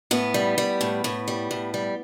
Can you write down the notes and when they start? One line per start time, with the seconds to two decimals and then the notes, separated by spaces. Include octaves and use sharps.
0.11 A2 B3
0.34 G3
0.58 G3
0.81 A2
1.04 A2
1.28 G3
1.51 A2
1.74 G3